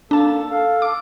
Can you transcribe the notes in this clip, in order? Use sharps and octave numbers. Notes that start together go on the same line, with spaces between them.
A#3 D4 A4 A5
A4 F5
D6